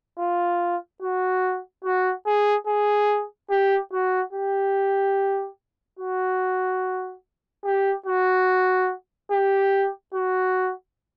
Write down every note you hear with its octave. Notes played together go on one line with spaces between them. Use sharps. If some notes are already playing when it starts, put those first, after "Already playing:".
F4
F#4
F#4
G#4
G#4
G4
F#4
G4
F#4
G4
F#4
G4
F#4